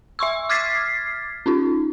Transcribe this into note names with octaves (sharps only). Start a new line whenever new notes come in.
E5 C6 C#6 E6
D6 F6 G#6 A6 B6 C7
C#4 D#4 F4